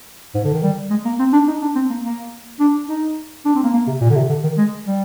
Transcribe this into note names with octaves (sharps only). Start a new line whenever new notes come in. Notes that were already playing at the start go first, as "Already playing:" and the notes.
G#2
D3
D#3
G3
G#3
A#3
C4
D4
D#4
D4
C4
A#3
A#3
D4
D#4
D4
C4
A#3
A#3
C3
A#2
D3
C3
D3
D#3
G#3
G3